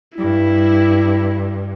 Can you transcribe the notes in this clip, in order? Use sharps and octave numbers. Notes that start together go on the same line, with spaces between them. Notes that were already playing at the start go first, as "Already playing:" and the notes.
G2 E4